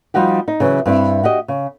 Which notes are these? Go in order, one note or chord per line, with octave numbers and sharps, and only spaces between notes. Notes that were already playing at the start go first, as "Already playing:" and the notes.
F3 G3 D#4 F#4 G4
D#4
C#3 E3 F#3
G2 C4 E4
F#4 G4 D#5
C#3